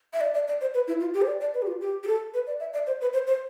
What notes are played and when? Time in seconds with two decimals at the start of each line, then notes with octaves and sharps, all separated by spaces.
0.13 E5
0.21 D5
0.34 D5
0.48 D5
0.61 C5
0.74 B4
0.88 E4
1.00 F4
1.14 G4
1.22 C5
1.27 D5
1.41 D5
1.54 B4
1.62 G4
1.67 F4
1.81 G4
2.04 G4
2.07 A4
2.34 B4
2.47 D5
2.60 E5
2.74 D5
2.87 C5
3.01 B4
3.13 C5
3.27 C5